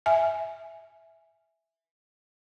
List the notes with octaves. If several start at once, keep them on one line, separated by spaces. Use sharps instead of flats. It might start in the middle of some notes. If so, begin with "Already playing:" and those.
E5 G#5